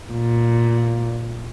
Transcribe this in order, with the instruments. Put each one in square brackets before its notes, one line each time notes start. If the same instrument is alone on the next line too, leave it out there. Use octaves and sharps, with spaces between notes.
[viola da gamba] A#2